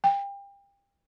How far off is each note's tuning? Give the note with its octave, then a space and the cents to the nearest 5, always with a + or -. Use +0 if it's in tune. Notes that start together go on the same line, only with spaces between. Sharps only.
G5 +30